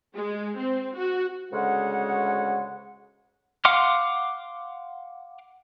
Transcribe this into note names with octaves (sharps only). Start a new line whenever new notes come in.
G#3
C4
F#4
D2 C#3 G#3 F#5
F5 F#5 C6 D6 F6